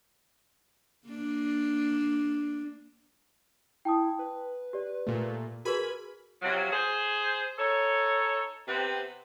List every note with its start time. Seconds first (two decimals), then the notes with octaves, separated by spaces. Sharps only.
1.07 A#3 D4
3.85 E4 G5 A5 D#6
4.19 B4
4.73 G4 D5
5.07 A#2 A3
5.65 F#4 G#4 A#4 B4 G#5 B5 G#6
6.42 C3 F3 F#3
6.71 G#4 C5
7.57 D#4 A4 C#5
8.67 C3 B3 C4 B4